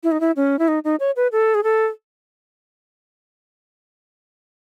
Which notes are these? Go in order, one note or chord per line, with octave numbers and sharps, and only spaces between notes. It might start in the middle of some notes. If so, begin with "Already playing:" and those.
E4
D#4
E4
C#4
E4
D#4
D#4
C#5
B4
A4
G#4
A4